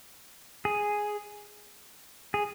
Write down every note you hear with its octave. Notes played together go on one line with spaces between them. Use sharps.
G#4
G#4